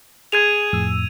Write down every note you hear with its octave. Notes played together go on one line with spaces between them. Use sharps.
G#4 G#6 D#7 F7
F2 A2 E6